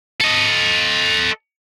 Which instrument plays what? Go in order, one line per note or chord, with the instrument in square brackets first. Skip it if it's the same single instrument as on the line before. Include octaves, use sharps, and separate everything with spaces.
[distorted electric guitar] A4 D#5